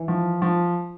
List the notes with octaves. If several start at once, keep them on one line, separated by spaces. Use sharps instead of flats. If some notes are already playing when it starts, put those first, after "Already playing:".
Already playing: E3
F3
F3